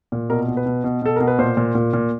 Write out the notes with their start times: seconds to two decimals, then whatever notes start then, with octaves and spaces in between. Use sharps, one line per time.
0.12 A#2
0.29 B2 A#4
0.48 B2
0.57 B4
0.66 B2
0.84 B2
1.02 B2 A4
1.16 B2 A#4
1.27 B4
1.39 A#2 C5
1.57 A#2
1.75 A#2
1.93 A#2